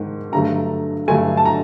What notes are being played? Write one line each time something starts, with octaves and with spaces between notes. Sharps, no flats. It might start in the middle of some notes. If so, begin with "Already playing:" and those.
Already playing: G#2 D#3 G#3
G2 D3 F#3 A3 A#5
G2 D3 F#3 A3 G#5
A5
A#5